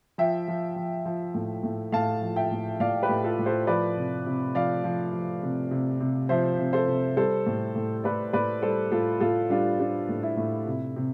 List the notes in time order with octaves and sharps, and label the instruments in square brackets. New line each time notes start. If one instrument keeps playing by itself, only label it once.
[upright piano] F3 E5 G5
F3
F3
F3
A2
A2
A2 F5 A5
F3
E5 G5
A2
A2 D5 F5
G4 B4
A2
F4 A4
A2
A4 C5
F3 B4 D5
C3
C3
F3 D5 F5
F3
F3
C3
C3
C3
F3 C5 E5
C3
A4 C5
C3
G3 A4 C5
A2
A2
A2 B4 D5
A2 B4 D5
G3 A4 C5
A2 F4 A4
A2 F4 A4
G3 D4 F4
G3 D4
A2
E4
A2
C3
C3